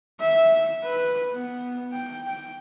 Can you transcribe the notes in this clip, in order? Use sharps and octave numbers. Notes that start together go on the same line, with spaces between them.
E5
B4
B3
G5
G5